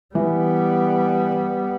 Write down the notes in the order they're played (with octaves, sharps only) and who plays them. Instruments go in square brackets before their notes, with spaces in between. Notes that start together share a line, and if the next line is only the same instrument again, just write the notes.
[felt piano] E3 [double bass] G3 B3